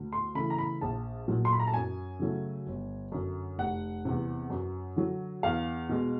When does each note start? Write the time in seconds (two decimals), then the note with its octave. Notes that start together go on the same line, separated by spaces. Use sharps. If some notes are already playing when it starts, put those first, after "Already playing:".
Already playing: D2
0.13 C6
0.35 C#3 E3 A3 B5
0.50 A#5
0.58 B5
0.81 A#1 A5
1.28 A#2 F#3
1.45 C6
1.52 B5
1.60 A#5
1.67 A5
1.74 F#2 G#5
2.19 C#3 F#3 A3
2.67 G1
3.12 F#2 D3
3.58 F1 F#5
4.05 E2 C3
4.50 F#2
4.96 D3 F#3
5.43 E2 F5
5.89 B2 G#3